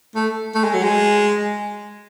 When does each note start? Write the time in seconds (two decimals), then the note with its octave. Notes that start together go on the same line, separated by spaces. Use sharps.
0.15 A3
0.55 A3
0.64 G#3
0.74 F#3
0.83 G#3